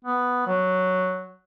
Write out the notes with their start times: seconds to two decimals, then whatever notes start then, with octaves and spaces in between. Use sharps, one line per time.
0.05 B3
0.47 F#3